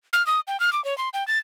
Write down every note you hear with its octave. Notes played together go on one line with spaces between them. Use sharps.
F6
D#6
G5
F6
D6
C#5
C6
G5
A6